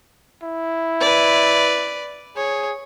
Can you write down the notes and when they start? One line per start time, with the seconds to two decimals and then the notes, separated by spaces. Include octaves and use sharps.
0.43 E4
1.01 B4 D5
2.37 G#4 C#5